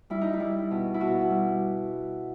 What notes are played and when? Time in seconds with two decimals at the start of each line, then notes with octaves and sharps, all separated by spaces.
0.10 G3 E4
0.21 D#4
0.33 E4
0.40 G3
0.71 B2
0.94 E4
1.00 B2 F#4
1.30 G3